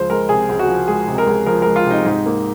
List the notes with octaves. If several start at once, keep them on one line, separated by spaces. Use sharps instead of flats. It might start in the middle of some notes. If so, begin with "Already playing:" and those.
Already playing: C#2 F3 C5
G#3 A#4
C3 G#4
C#2
F#4
F3
G#3 G#4
C3
A#4
C#2
F3 A#4
A#4
G#3
F4
C3 D#4
G#2
A#3